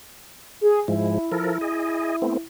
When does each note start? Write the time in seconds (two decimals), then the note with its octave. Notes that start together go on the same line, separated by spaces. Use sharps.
0.61 G#4
0.88 G#2 F3 G#3 E4
1.32 F3 A4 A#4
1.61 G#4 D#5
2.22 A3 B3 C4